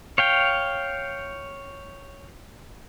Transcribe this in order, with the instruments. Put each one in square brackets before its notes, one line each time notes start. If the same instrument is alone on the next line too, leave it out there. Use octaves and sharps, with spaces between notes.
[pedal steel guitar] C#5 F5 G5